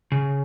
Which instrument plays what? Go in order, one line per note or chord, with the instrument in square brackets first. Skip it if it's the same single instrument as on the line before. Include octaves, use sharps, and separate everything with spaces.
[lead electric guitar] C#3